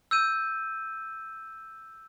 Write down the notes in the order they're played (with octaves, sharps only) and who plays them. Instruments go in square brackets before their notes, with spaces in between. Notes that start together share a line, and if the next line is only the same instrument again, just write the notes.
[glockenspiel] E6 G6 D#7